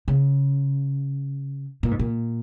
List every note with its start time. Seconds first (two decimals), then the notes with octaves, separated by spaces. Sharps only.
0.08 C#3
1.83 A#2
1.91 G#2
1.99 A#2